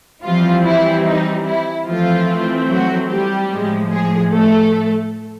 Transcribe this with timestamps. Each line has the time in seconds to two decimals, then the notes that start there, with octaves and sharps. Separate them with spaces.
0.24 E3 F3 G3 C4 F4
0.65 E4
1.06 D#4
1.46 E4
1.87 E3 F3 A3 C4 F4
2.69 F#3 F#4
3.09 G3 G4
3.50 A2 F3 G#3
3.91 G#3 G#4
4.32 A3 A4